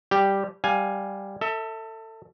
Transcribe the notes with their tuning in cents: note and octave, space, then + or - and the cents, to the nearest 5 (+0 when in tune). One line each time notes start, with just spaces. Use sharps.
G3 +0 G4 +0
G3 +0 F5 +20 G#5 +0
A4 +25 E5 -20